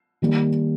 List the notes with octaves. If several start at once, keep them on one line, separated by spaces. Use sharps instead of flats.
D#3 G3 A#3